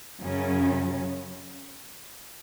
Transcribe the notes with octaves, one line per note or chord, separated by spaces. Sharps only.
F#2 C#3 F#3 C#4